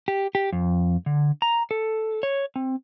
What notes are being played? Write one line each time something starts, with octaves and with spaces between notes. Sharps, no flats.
G4
G4
F2
D3
A#5
A4
C#5
C4